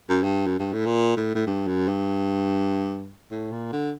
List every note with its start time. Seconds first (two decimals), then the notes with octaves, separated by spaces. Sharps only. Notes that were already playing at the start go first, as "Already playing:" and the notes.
0.09 F#2
0.24 G2
0.47 F#2
0.59 G2
0.73 A2
0.86 A#2
1.17 A2
1.35 A2
1.47 G2
1.67 F#2
1.88 G2
3.31 A2
3.52 A#2
3.73 D3